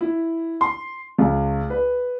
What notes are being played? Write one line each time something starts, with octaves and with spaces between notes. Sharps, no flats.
E4
C6
C#2
B4